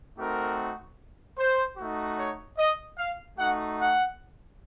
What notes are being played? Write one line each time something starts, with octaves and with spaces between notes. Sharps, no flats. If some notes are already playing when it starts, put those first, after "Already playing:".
A3 C4 D#4 F#4 A#4
C5
A3 D#4 F#4
C#5
D#5
F5
A3 D#4 F#4 F#5
F#5